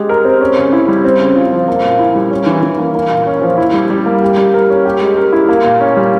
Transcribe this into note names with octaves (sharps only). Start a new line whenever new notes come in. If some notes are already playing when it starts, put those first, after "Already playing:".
Already playing: G#3 G4
A#4
C4
C#4
C#3
E4
G3
C4
C#3
F4
F3
A#3
A#2
E4
G3
C#4
E3
E3
A#3
A#3
A#2
C#4
F3
E4
G3
G3
A#3
G4
G3
A#4
C#4
G4
G#3
A#4
E4
A#3
A#2
C#4
G3